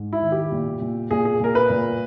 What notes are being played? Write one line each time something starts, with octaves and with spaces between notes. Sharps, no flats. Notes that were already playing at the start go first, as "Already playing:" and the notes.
Already playing: G#2
E4
D#3
G4
A#2
A#2
A#2 G#4
G#4
A#2 A#4
B4
A#2